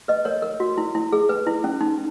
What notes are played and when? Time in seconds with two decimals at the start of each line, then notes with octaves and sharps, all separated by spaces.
0.08 B4 D#5
0.25 A#4 C#5
0.42 A#4
0.60 F#4
0.78 E4
0.95 E4
1.13 G#4
1.29 B4
1.47 E4
1.64 C#4
1.81 D#4